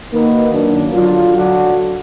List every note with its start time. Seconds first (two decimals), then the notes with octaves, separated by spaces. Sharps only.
0.12 D#3 A#3 D#4 F#4 B4
0.53 F#2 D#3 A#3 D4
0.94 D3 F#3 D4 F4
1.34 D3 F#3 D4 F#4